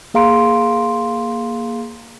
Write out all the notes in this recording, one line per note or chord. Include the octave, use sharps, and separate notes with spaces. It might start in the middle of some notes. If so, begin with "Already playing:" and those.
A#3 G#4 F5 A#5 C6 D7